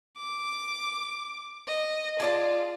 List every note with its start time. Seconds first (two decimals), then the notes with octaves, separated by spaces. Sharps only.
0.17 D6
1.67 D#5
2.20 F4 G#4 D5 A5